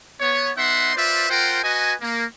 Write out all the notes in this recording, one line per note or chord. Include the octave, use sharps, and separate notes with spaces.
B3 C#5
B3 D#4 E5 F#5 C6
F4 B4 C5 D5 E5
F4 A#4 C5 F#5 G5
F#4 B4 D#5 G#5
A#3